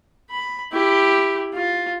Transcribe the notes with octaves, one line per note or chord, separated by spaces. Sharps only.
B5
E4 G4
F4